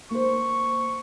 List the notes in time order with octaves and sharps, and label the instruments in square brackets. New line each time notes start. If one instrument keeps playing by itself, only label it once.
[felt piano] A#3 C5 [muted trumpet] C#6